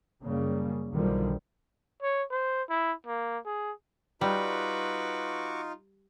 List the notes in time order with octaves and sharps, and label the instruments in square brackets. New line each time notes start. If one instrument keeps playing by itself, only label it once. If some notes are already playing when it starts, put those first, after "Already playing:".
[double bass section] F#2 C#3 G3 A#3
B1 D3 D#3 F3 G3
[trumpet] C#5
C5
E4
A#3
G#4
[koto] G3 [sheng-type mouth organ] D#4 F4 [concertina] F#4 C#6 D6 [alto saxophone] B4